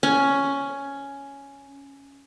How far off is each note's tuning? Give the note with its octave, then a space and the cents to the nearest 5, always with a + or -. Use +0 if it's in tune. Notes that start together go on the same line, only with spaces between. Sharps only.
C#4 +5